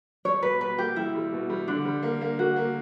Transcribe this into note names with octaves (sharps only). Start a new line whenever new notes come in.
G3 C#5
B2 B4
B2 B4
A#3 G4
G3 E4
G3
B2
G3
D3 D4
G3
A#3
A#3
A#3 F#4
A#3